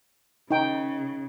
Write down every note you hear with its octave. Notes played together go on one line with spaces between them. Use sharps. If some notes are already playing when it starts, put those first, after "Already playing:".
C#3 D#4 G5